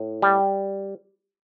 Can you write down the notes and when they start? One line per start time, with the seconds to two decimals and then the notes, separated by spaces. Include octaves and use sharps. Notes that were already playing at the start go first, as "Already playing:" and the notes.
Already playing: A2
0.22 G3